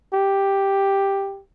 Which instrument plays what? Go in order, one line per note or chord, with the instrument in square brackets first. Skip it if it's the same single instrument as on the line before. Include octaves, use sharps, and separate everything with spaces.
[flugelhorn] G4